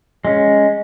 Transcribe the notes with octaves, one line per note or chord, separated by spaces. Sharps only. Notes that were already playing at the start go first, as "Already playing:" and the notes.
G#3 C#4